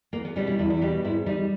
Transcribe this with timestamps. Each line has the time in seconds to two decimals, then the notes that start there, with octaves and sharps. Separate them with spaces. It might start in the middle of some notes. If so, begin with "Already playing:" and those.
0.13 E2 A#3
0.25 B3
0.36 B2 G3 C#4
0.47 E4
0.59 E2 E4
0.70 E4
0.81 B2 G3 G4
1.04 G#2 E4
1.26 G3 D#4